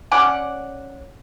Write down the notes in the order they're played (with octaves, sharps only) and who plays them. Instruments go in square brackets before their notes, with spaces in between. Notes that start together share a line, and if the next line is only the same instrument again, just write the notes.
[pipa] C#4 D5 F#5